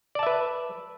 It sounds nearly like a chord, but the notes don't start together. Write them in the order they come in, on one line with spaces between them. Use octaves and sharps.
D5 A5 E5 B4